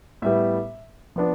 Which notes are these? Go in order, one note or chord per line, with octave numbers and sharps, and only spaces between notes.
A2 G3 B3 E5
F3 B3 D4